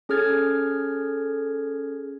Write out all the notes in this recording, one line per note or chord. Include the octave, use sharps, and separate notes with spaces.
C#4 G#4 A4 F6 G#6 A6